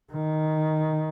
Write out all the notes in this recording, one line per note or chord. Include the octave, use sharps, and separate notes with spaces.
D#3